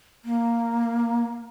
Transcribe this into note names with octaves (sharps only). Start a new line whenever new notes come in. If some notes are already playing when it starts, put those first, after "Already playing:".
A#3